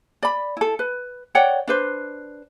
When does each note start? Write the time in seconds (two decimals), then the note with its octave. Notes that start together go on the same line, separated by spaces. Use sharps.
0.23 D5 B5
0.57 E4 A4
0.79 B4
1.35 C#5 D5 F#5 G5
1.67 D4 B4 C5